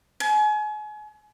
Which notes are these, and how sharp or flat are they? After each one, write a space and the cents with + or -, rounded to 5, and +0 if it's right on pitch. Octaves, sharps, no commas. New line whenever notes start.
G#5 +35